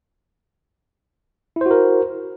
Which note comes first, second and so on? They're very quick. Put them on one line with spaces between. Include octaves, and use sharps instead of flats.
E4 C5 F#4 A#4